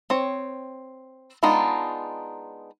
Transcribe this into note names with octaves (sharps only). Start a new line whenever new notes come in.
C4 C#5
G#3 B3 D4 D#4 F4